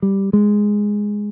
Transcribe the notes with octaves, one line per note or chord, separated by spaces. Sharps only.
G3
G#3